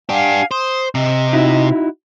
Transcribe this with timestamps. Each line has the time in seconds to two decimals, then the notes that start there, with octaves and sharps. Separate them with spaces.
0.09 D4 G4 F5 F#5 G#5
0.51 C5 D#6
0.95 C3 D#5
1.33 D#4 E4 F#4